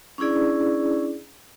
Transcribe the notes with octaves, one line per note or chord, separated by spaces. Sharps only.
C#4 D4 E4 G#4 D5